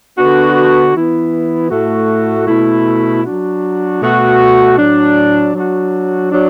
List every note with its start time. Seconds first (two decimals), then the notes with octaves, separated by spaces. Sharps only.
0.17 D3 B3 D4 F#4
0.94 E3 B3 E4
1.71 A2 A3 F#4
2.48 B2 A3 E4
3.25 F#3 D4 F#4
4.01 B2 A3 F#4
4.78 A2 F#3 D4
5.54 F#3 D4 F#4
6.32 F#3 D4